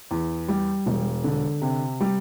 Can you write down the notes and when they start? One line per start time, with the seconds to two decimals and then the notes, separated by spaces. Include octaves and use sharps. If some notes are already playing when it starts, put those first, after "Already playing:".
0.11 E2
0.48 G3
0.86 E1
1.24 D3
1.61 C3
2.00 G3